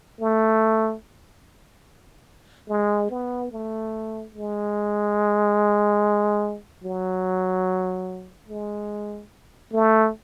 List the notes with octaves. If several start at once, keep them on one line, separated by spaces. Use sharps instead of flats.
A3
G#3
B3
A3
G#3
F#3
G#3
A3